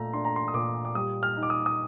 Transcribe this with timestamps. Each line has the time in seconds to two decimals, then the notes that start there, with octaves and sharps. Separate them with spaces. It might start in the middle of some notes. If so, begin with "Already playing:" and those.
Already playing: A#2 A3 A#5
0.13 D4 C6
0.25 A#5
0.36 C6
0.48 D#6
0.54 A#2 D6
0.85 D6
0.95 G3 D#6
1.23 F6
1.37 D#4
1.43 D6
1.50 D#6
1.66 D#6